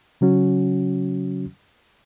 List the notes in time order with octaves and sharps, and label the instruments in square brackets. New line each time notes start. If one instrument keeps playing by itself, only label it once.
[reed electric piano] C#3 F#3 C#4 F#4